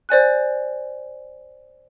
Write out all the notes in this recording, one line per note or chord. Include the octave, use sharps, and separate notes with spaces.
C5 D5 G#5 F#6